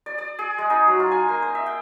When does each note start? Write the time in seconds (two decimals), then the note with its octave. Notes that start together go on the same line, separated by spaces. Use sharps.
0.06 D5
0.18 D5
0.39 G#4
0.58 G#3
0.70 D#4
0.87 F#3
1.00 F4
1.11 G#5
1.29 A#3
1.42 C5
1.55 E5
1.66 G5